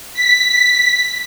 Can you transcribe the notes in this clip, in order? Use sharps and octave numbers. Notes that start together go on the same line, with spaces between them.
B6